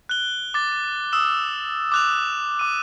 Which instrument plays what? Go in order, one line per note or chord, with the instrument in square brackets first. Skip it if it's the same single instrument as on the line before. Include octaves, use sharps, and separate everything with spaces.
[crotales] F#6 G7
D6 A6
D#6 E6 E7
D6 F#6 F7
D6 D#7